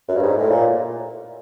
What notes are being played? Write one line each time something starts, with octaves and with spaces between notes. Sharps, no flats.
F#2
G2
G#2
A2
A#2